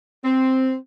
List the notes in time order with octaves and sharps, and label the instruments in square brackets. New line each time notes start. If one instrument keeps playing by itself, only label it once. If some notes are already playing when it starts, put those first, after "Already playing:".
[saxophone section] C4